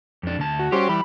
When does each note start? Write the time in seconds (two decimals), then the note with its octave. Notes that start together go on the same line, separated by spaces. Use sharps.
0.23 F2 D4
0.39 D2 A5
0.59 F#4
0.72 G3 C#4 G4 C5 G5
0.89 E3 G3 B5